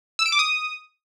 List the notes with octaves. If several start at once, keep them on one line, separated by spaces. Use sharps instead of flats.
E6
D7
D6
D#6